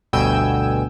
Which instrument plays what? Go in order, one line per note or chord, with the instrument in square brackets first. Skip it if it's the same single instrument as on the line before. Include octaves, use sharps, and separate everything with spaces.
[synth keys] G1 D2 B2 G5 G#5 E6